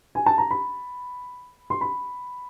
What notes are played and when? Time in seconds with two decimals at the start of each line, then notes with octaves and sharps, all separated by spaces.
0.15 G#5
0.26 A5
0.38 A#5
0.51 B5
1.70 C6
1.81 B5